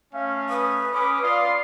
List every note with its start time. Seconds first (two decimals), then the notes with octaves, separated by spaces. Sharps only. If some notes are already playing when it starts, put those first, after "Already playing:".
0.14 A3 C#4 F5
0.49 B4 D#6
0.93 C#4 B5 D6 D#6
1.23 F4 D5 F5 C6